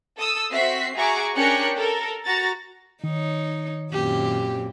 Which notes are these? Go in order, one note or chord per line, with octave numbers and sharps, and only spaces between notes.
A4 D#6 E6
C4 F#4 E5 B6 C7
F#4 G#4 E5 A#5 C#6 D6
C#4 D4 G4 A#4 F#6 C#7
A4 A#4
F#4 A#5 A6
D#3 D#4 C#5
F#2 A#2 C4 G4